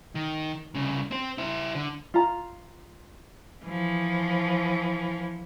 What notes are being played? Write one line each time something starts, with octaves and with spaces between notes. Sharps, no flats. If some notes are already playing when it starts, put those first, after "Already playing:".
D#3
C2 C#3
C4 C5
E4 C5
D3
F4 A#5
E3 F3